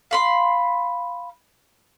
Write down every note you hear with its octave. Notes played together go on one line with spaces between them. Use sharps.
F5 B5 C6